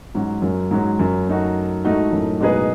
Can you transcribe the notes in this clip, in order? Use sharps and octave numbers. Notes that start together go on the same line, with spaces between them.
G#2 F#3 C#4 F#4
F#2
G#2 F#3 C#4 F#4
F#2
A3 D#4 F#4
G#2 A3 D#4 F#4
F#2 A2
B2 G#3 D#4 G#4 B4